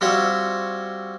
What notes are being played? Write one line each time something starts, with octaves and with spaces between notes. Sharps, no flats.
G3 C4 F4 F#4 C#5 E5